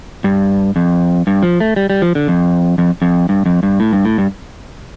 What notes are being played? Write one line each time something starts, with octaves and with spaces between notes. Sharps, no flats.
G2
F2
G2
F3
A3
G3
G3
F3
D3
F2
F2
F2
G2
F2
G2
A2
G2
A2
G2